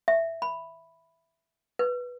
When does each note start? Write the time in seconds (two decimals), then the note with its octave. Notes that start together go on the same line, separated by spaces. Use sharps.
0.08 E5
0.42 B5
1.79 B4